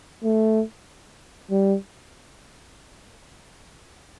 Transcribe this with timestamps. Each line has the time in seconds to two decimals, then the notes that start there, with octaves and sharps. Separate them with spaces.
0.24 A3
1.51 G3